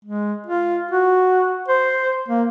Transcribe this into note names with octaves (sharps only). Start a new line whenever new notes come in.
G#3
F4
F#4
C5
A#3